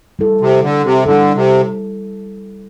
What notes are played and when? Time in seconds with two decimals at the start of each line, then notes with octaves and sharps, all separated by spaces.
0.19 G3 E4 A4
0.41 C3
0.63 D3
0.84 C3
1.06 D3 G3 E4 A4
1.35 C3